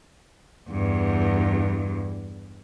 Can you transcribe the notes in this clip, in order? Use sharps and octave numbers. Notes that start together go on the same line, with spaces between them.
E2 G2